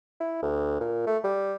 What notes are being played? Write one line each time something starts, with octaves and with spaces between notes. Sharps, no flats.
E4
D2
A#2
A3
G3